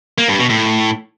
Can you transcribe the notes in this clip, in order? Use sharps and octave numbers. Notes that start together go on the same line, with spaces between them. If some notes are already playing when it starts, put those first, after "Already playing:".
A#3
G2
B2
A2